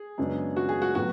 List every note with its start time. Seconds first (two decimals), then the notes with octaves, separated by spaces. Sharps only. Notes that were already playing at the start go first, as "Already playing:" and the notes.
Already playing: G#4
0.18 F#2 C#3 G#3 B3 D4
0.56 F#4
0.69 G#4
0.82 F#4
0.94 A2 F#3 B3 F#4